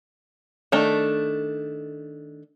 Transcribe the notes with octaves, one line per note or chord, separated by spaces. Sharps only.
D#3 A3 D4